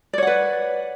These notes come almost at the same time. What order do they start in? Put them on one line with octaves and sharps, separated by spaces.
D5 C#5 F#5 B4